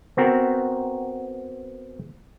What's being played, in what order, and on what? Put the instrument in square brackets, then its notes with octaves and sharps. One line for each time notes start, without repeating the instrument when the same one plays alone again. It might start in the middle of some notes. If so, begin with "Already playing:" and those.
[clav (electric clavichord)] B3 C4 F#4 A#4